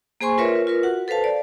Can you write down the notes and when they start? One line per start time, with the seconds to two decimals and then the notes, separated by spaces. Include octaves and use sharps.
0.21 A#3 G#4 C5 G#5 C6 C#6
0.38 F4 A#4 B4 C#5 E5
0.67 F4 A#4 B4
0.83 F#4 F#5
1.08 A4 B4 C5 F5 A5
1.24 D5